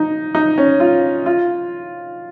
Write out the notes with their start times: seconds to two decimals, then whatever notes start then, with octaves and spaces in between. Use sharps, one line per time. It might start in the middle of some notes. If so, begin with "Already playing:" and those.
Already playing: D#4
0.35 D#4
0.58 C#4
0.80 F4
1.26 F4